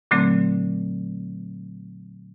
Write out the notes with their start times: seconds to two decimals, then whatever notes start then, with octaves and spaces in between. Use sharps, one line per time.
0.11 A#2 D3 F#3 A3 C4